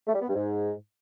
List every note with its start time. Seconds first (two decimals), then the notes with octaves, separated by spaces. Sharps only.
0.07 A3
0.14 G3
0.21 B3
0.28 G2
0.35 G#2